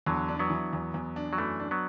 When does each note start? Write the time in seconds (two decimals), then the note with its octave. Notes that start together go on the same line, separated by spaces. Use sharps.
0.06 E2 D3 F#3
0.28 D4
0.39 F#3 B3
0.50 E3
0.73 E2
0.94 E2
1.16 D4
1.33 F#3
1.38 F#2 E3 A3
1.60 D4
1.71 F#3 B3